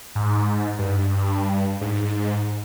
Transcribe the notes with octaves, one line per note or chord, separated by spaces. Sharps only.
G#2
G2
G#2